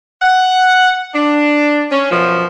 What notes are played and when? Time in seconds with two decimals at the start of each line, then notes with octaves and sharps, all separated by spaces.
0.22 F#5
1.14 D4
1.90 C#4
2.10 F#2 B2 F3